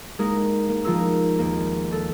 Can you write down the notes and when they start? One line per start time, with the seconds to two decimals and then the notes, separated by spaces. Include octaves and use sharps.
0.19 G#3 A#3 D#4 G#4 A#4
0.69 A#3
0.85 F3 D#4 F4 G#4 A#4 E6
1.38 D#2 A#3
1.92 A4